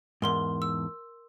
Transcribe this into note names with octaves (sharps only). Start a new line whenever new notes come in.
E2 G#2 A#4 C6 G7
E6